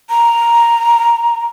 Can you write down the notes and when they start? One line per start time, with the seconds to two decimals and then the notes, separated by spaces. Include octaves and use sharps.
0.10 A#5